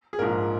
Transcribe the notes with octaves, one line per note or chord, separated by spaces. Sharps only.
G#4
A#1 G#2 F3 A#4